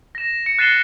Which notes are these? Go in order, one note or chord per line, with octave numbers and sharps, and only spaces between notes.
A#6 E7
C#7
F#6 A6 C7 D#7 E7 G7